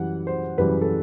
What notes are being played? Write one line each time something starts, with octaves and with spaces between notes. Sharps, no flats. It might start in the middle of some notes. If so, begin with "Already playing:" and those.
Already playing: F#2 E3 G3 F#5
C5
F#2 E3 G3 B4
A4